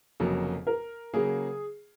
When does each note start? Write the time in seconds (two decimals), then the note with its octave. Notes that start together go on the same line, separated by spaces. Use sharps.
0.20 F1 F2 C#3 F#3 A#3 F#4
0.67 A#4
1.14 C#3 F#3 A#3 G#4